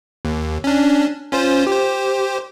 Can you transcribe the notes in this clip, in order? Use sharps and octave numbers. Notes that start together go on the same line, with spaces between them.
D#2
C#4 D4
C#4 F4 C5
G4 C5